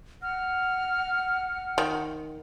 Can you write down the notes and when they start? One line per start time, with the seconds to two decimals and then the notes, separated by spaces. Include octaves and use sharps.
0.22 F#5 F6
1.78 D#3